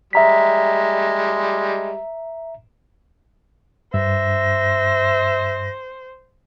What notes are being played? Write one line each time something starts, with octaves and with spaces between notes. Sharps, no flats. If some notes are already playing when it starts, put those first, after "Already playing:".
G3 G#3 E5 A#5 B6
G2 C5 E5 A#6